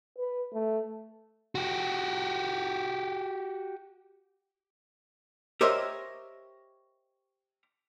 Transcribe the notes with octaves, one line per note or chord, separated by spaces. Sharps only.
B4
A3
F#4 G4
G4 A#4 C5 C#5 D#5 E5